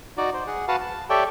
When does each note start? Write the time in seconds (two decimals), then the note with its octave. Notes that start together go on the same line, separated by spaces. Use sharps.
0.17 D#4 F#4 D5
0.34 C5
0.47 G#4 F#5
0.68 F#4 B4 F5 F#5 A5
0.81 A5
1.10 G4 A4 C#5 D5 E5 G5